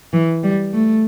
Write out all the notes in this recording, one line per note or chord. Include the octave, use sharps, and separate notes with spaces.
E3
G3
A3